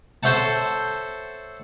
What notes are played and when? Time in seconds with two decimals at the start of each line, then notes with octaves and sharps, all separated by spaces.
0.23 A4 C5 C#5 E5 F#5 A5